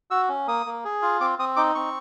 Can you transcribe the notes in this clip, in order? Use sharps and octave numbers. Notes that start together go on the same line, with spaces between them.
F#4 E6
C#4
A#3 D#6
A#3
G#4
F4
C4 D6
C4 D#6
D#4 D6
C4 C#6